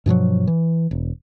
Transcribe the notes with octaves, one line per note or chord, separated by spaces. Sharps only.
G2 B2 F3 F#3
E3
E1